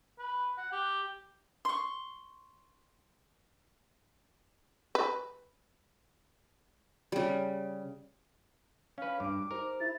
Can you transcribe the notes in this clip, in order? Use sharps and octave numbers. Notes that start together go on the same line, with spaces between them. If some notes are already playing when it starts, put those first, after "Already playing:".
B4
F#5
G4
C6 C#6
B4
C#3 G3
C#4 B4 F5
G2 D6
D#4 G4 A#4 C5
E4 A6